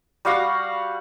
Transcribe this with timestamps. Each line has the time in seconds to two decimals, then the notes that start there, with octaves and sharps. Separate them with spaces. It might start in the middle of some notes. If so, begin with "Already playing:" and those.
0.25 G3 F#4 F5 F#5